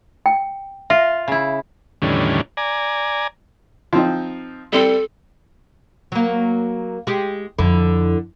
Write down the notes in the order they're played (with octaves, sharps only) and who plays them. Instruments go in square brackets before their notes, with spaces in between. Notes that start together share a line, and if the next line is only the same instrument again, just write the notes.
[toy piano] G5
[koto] F4 [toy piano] E5
[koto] C#3 E4
[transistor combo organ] E2 A2 D3 D#3 G3 C#4
D5 G#5 A#5
[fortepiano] F3 C4 D#4
[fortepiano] G3 C4 [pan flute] A4
[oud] F#3 A#3
G#3 G4
[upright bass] F2 [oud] D3 E4